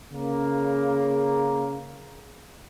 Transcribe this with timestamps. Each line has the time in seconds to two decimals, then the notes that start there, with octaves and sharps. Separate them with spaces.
0.12 C#3 A#3